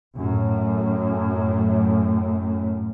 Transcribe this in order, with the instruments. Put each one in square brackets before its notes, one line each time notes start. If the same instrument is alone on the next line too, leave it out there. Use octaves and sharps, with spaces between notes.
[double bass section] F#2 A2